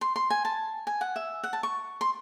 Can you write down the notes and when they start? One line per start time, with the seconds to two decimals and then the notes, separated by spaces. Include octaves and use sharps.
0.01 C6
0.16 C6
0.30 G#5
0.45 A5
0.87 G#5
1.01 F#5
1.16 E5
1.44 F#5
1.53 A5
1.63 C#6
2.01 C6